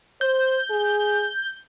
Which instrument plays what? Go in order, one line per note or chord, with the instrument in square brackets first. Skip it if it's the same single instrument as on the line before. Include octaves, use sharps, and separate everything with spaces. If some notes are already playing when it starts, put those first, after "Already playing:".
[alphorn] C5 [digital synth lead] G6
[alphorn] G#4